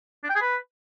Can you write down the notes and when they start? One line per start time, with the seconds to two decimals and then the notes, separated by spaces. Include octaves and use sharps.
0.24 D4
0.30 G5
0.36 G#4
0.41 B4